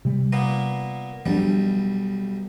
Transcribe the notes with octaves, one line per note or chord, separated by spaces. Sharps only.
C3 G3
A#2 A#3 B3
B1 F3 G3 C#4 D4